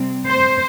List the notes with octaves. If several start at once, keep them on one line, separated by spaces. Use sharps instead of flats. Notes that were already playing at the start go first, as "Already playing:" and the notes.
Already playing: C3 G3 C4
C5